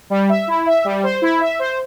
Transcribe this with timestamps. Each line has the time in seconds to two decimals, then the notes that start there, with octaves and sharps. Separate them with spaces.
0.10 G3
0.29 E5
0.48 E4
0.66 E5
0.85 G3
1.03 C5
1.22 E4
1.40 E5
1.59 C5